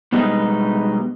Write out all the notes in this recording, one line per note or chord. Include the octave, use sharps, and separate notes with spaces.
B2 G3 G#3 B3 D#4